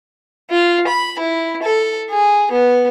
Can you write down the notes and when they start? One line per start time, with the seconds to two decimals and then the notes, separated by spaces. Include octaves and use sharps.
0.50 F4
0.87 B5
1.19 E4
1.62 A4
2.10 G#4
2.51 B3